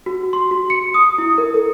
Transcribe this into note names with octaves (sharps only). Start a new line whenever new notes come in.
F#4
C6
F#4
C#7
D#6
E4
A#4
A4